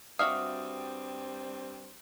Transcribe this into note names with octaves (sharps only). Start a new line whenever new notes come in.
G2 G3 C4 F#4 E5 F5 D#6